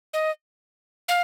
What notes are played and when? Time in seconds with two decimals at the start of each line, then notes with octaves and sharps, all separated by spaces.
0.13 D#5
1.08 F5